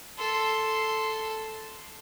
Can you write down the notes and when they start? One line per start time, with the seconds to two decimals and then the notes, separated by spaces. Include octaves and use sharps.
0.18 A4 C6